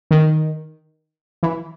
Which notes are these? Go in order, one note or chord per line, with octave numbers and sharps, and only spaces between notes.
D#3
E3